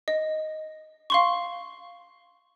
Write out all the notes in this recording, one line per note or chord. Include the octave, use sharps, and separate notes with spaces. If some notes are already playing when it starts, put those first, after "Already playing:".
D#5
F5 C6 C#6